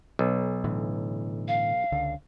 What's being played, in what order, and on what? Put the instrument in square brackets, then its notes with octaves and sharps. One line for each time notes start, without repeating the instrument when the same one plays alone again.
[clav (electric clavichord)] B1
[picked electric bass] A2 D3 E3
[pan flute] F5
[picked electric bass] C#2 D3